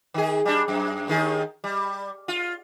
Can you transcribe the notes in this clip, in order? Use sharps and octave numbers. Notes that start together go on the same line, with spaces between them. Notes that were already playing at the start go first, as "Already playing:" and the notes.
D#3 G#4
G3 D4
F#2
D#2 D#3 G#4
G3
F4